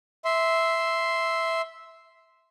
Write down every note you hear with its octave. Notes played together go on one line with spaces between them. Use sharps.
E5 C6